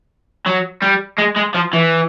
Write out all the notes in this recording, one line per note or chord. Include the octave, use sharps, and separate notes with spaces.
F#3
G3
G#3
G#3
F3
E3